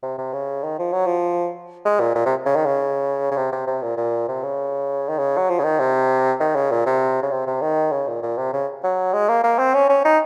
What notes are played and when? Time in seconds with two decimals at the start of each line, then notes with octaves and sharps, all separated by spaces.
0.03 C3
0.18 C3
0.33 C#3
0.64 D#3
0.79 F3
0.93 F#3
1.06 F3
1.85 G#3
2.00 A#2
2.15 A#2
2.26 C3
2.46 C#3
2.56 D#3
2.66 C#3
3.31 C#3
3.37 C3
3.52 C3
3.67 C3
3.82 A#2
3.97 A#2
4.28 C3
4.43 C#3
5.09 D#3
5.19 C#3
5.37 F#3
5.50 F3
5.59 C#3
5.64 D#3
5.79 C3
6.40 D#3
6.55 C#3
6.71 A#2
6.86 C3
7.23 C#3
7.31 C3
7.47 C3
7.62 D#3
7.92 C#3
8.08 A#2
8.22 A#2
8.38 C3
8.53 C#3
8.84 F#3
9.13 G#3
9.29 A#3
9.44 A#3
9.59 C4
9.74 C#4
9.89 C#4
10.05 D#4